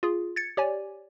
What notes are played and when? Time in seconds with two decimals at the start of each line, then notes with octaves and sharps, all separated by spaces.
0.03 F4 G#4
0.36 G#6 A6 C#7
0.57 G4 C#5 D5 G#5